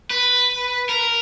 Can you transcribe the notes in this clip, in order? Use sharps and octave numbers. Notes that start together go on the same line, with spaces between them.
B4
A#4